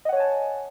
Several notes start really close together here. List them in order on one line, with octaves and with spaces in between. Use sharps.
D#5 F#5 C#5 G#5 A5